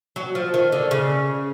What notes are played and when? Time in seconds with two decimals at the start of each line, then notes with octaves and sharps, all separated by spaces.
0.16 F#3
0.35 F3
0.54 D#3
0.72 D3
0.91 C#3